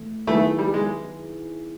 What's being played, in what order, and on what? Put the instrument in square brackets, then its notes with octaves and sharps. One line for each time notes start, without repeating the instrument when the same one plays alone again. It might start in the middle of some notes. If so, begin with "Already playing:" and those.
Already playing: [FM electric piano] E3 A3
[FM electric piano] D#3 F#3 B3 E4 G#4 [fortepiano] A3
[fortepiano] G3
G#3